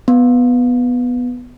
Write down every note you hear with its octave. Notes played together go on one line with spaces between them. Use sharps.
B3